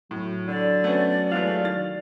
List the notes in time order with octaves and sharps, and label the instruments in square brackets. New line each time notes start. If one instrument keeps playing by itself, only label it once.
[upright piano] A2 [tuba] F#3
[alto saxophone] D3 [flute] D5
[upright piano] A3 B3 C#4
[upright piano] E3 G#3 A3 [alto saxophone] F5
[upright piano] D#3 A6